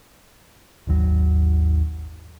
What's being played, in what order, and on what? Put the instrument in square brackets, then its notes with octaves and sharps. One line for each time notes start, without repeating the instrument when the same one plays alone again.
[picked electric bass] G#1 D#2 F#3